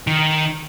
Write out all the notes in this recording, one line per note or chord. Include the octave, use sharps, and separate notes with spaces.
D#3